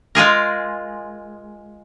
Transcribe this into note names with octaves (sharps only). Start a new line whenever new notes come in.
G#3 F4 G#4 A#4